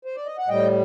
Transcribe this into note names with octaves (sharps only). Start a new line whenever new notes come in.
C5
D5
D#5
F#5
A2 G3 D#5 G5